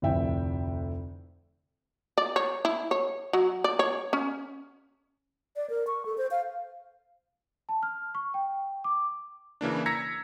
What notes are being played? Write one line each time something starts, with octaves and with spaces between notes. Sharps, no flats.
F1 D2 A2 E5 G5
D5
C#5
E4
C#5
F#3
D5
C#5
C#4
D5
A#4
C#6
A4
C5
F5
A5
F6
C#6
G5
D6
C#3 E3 A#3 D4
A#5 E6 G#6 A#6 B6 C#7